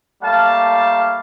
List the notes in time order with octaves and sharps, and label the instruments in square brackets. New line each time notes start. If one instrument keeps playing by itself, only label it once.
[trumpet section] G3 A3 A#3 F5 A5